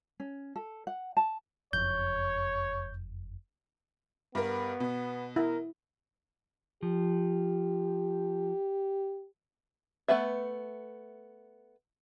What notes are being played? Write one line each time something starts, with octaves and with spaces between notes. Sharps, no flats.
C#4
A4
F#5
A5
F#1 F2 C#5 G6
G2 B3 A#4
B2
E4 A#4
F3 G4
A3 B3 B4 E5